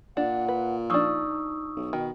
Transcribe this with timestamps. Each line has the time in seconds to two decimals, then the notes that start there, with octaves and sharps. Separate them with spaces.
0.17 A#2 D4 F#5
0.48 B4
0.90 F3 D4 D#4 C#6 D#6 E6
1.76 B1
1.93 B2 D#3